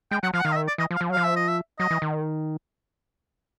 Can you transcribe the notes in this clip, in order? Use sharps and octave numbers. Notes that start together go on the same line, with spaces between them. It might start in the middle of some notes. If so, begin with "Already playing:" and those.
G#3 G5
F#3 F#5
F3 F5
F#5
D#3 F5
D#5
E5
D5
E3 D#5
F3
F5
F3
F#3
F3 F5
E5
D#5
E5
F#3 D#5
E3
D#3